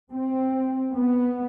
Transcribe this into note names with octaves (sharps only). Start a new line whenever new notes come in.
C4
B3